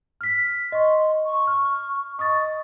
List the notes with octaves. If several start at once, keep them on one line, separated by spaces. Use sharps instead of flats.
F6 B6
D#5 C6 C#6
C#6
F6
D#5 C#6 D#6 A6